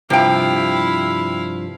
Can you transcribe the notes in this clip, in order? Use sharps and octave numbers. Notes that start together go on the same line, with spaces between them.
G2 C3 F3 E4 F5 G5